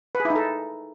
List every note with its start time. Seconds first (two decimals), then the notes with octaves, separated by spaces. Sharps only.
0.15 B4
0.20 G#4
0.25 E4
0.30 D#4
0.35 A4